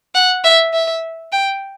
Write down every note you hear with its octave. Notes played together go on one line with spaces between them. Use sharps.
F#5
E5
E5
G5